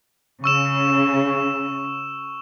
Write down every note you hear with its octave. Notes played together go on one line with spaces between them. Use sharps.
C#3 C#6 E6 E7